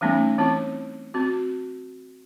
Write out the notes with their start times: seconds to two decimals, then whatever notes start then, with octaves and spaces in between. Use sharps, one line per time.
0.01 E3 G3 A3 B3 C#4 D#4
0.38 E3 C4 E4 A5
1.14 C4 F#4